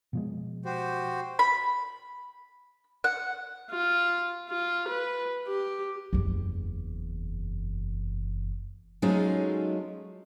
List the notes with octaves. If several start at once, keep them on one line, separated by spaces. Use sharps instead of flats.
B2 F3 G#3
F#4 G4 C5
B5
F#5
F4
F4
B4
G4
F#1 E2
F#3 G#3 A3 C#4 D#4 F4